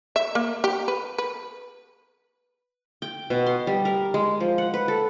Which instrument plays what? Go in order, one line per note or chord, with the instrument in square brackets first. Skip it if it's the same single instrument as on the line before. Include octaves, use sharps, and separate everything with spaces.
[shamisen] E5
A#3
G4
B4
B4
[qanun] G5
B2
C6
G3
A#4
G#3
F3
F#5
B4
A4